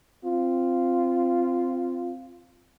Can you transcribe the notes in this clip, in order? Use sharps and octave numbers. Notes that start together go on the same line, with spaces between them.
C4 F4